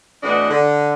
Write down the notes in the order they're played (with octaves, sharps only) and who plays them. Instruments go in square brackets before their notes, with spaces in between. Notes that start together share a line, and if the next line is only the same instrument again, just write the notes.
[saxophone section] A2 E3 B3 D4 F#4 D#5
D3